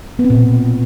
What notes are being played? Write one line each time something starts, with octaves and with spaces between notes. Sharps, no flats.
B3
C4
A#2
B2